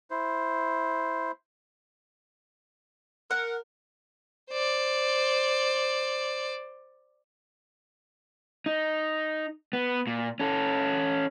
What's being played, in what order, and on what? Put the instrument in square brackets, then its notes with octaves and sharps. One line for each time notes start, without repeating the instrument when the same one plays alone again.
[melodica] E4 C5
[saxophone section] A#4 [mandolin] F#5
[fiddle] C5 D5
[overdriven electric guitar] D#4
B3
A#2
C#4 A4